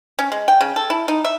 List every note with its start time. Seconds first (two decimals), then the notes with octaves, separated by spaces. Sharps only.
0.19 C#4
0.32 G#3
0.48 G5
0.61 C#3
0.76 A4
0.90 E4
1.08 D#4
1.24 E5